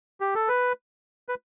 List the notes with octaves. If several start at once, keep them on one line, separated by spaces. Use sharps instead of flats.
G4
A4
B4
B4